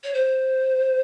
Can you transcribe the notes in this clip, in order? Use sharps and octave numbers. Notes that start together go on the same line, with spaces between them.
C#5
C5